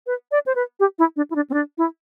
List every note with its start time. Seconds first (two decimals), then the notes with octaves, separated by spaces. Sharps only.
0.07 B4
0.31 D5
0.46 C5
0.55 B4
0.80 G4
0.99 E4
1.16 D4
1.30 E4
1.35 D4
1.50 C4
1.54 D4
1.78 E4